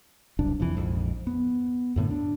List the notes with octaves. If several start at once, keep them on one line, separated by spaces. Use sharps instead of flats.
E1 C2 F#2 D4
F2 C3 E3
A#1 F2 G#2
B3
F#2 A2 D3 B3
D4